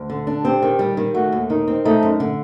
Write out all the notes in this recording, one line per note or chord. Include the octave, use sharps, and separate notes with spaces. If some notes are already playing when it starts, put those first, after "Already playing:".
Already playing: D2
D3
D4
C4 G4
D#3
G3
D#3
A3 F#4
D#2
D#3 D#4
C4
A3 D#4
F#2
D3